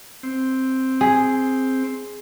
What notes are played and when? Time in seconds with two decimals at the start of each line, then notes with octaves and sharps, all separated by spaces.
0.23 C4
1.01 G#4